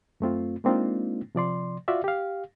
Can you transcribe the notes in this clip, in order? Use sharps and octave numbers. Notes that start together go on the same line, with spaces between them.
F#2 A3 C4 F4
G#3 A#3 C4 D4 D#4 F4
C3 F3 D5 C6
F4 F#4 D5 E5 F5
G4 F5